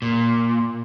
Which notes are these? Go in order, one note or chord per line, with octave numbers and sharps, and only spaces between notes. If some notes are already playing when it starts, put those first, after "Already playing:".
A#2